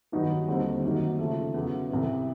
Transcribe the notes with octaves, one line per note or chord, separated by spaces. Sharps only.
G2 D#3 F#3 B3 D#4
D#2 D3 G3 C4 D#4
F#2 D#3 F#3 A#3 D#4
C#3 F3 A3
E2 C#3 F#3
C2 C3 E3